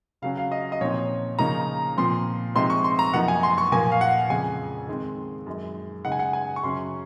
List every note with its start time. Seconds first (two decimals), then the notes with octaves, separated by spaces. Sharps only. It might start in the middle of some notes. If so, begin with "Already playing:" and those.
0.22 C#3 F#3 C#4 F5
0.37 F5
0.52 D#5
0.72 D#5
0.81 A#2 F3 C4 D#4 C#5
1.39 C#3 F3 A#3 D#4 A#5
1.97 A#2 F3 C4 C6
2.55 C3 F3 G#3 C4 D#4 C6
2.70 C#6
2.84 C6
2.99 A#5
3.13 F#2 F3 A#3 D#4 F#5
3.28 G#5
3.43 C6
3.58 C#6
3.72 A#2 F3 A#3 G#5
3.92 F5
4.01 F#5
4.30 F2 C#3 G#3 G#5
4.88 D#3 G#3 C4
5.46 F#2 D#3 G#3
6.05 C#3 G#3 D#4 F#5
6.12 G#5
6.19 F#5
6.33 G#5
6.56 C#6
6.63 F#2 C#3 F#3 C#4 C6